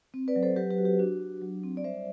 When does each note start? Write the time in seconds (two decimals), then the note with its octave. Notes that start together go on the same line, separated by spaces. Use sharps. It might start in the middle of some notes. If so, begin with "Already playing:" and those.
0.14 C4
0.28 B4 D5
0.36 F#3
0.43 A4 C5
0.56 F#3 G4 B4
0.71 G4 B4
0.78 F#4
0.85 G4
0.99 D4 F#4
1.20 D4
1.41 F#3
1.63 C4
1.77 D5
1.84 G3 C5 E5